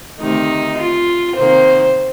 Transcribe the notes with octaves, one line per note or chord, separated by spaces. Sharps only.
D2 C3 D#3 D#4
F4
C3 D#3 A#3 C5